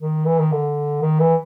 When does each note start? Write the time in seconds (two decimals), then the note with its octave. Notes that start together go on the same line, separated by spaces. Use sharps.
0.01 D#3
0.25 E3
0.39 D#3
0.52 D3
1.02 D#3
1.20 E3